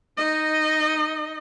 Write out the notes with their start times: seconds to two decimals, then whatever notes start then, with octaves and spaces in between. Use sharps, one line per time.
0.17 D#4 D#5